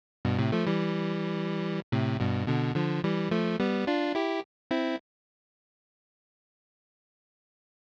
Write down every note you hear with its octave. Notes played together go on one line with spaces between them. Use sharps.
G2 B2
A2 C3
F3 A3
E3 G3
A2 C3
G2 B2
B2 D3
D3 F3
E3 G3
F3 A3
G3 B3
D4 F4
E4 G4
C4 E4